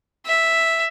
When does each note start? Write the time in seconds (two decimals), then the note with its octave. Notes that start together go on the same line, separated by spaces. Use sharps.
0.26 E5